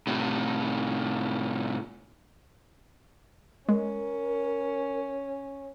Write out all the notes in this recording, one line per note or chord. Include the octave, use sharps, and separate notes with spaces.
A2 C3
G#3 C#4 A#4